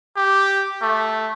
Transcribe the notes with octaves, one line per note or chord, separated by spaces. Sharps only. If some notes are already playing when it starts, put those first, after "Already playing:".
G4
A3